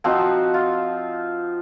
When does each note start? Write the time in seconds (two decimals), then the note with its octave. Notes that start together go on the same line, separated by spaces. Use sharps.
0.04 F3 C4 D#4 F#4
0.54 F4